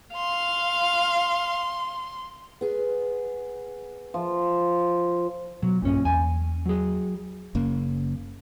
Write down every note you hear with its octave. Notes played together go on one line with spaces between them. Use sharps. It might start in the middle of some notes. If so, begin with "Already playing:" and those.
F5 C6
B3 G#4
F3
B2 F#3
A#1 G2 A#2 C#4
E2 A#3 G#5
F#3 G#4
F#1 C#3 A#3